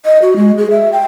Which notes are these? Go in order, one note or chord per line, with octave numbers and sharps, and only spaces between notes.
D#5
F#4
G#3
G#4
E5
G5